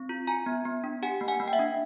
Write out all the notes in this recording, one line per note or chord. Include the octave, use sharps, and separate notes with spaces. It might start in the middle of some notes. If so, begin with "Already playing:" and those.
Already playing: C4
F4
F4 G#5 A#5
B3
B3
D4
G4 F#5 G#5
A#3
F#5 G#5
A#3
G5
E5 F#5
D4